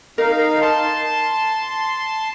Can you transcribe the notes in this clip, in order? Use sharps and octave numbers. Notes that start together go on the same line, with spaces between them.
D#4 A#4 F5
A5 C6